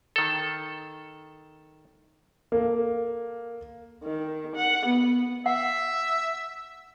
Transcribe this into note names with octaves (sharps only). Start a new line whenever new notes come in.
D#3 A4
A#3 A4
D#3
F#5
B3
E5 F#5